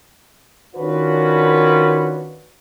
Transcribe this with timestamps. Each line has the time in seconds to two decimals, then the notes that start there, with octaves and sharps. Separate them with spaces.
0.76 D#3 C#4 D4 F4 F#4 B4